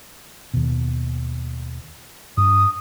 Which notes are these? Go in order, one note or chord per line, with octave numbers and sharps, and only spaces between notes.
D#2 B2
G2 D4 D#6